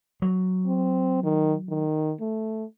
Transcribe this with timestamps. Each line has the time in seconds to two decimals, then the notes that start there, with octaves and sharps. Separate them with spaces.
0.22 F#3
0.66 C4
1.24 D#3
1.69 D#3
2.20 A3